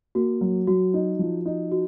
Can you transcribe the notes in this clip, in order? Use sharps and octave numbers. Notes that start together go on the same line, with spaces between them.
A#3 F#4
F#3
F#3 F#4
D#4
F3
D#4
F#4